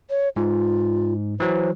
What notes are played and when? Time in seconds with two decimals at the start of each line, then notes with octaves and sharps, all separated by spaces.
0.10 C#5
0.36 G#2 F4
1.40 E3 F#3 C5